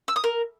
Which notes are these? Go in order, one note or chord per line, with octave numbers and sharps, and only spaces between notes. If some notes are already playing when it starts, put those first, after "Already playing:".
E6
D#6
A#4